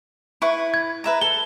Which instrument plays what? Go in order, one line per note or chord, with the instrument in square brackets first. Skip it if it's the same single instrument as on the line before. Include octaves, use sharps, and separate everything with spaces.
[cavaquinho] E4 B4 C#6
[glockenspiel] G#6
[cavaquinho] B4 E5 A#5
[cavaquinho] A4 [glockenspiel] G7